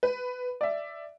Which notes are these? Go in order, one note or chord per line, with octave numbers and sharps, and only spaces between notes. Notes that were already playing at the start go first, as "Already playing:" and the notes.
B4
D5 E5